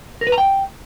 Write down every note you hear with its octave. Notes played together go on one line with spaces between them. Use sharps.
A#4
B4
A#5
G5